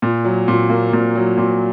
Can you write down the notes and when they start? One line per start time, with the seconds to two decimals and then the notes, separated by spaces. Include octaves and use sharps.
0.02 A#2
0.25 F#3
0.48 A#2
0.70 A#3
0.93 A#2
1.15 F#3
1.37 A#2